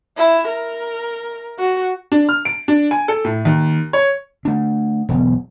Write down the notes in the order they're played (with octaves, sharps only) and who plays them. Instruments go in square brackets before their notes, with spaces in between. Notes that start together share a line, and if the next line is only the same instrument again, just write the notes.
[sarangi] E4
A#4
F#4
[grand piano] D4
F6
D7
D4
G#5
A4
A2
D#2
C#5
[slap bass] A3 D4
E1 B1